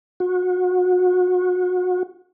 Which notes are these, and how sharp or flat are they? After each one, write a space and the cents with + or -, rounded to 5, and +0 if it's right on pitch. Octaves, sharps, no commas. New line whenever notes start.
F#4 -30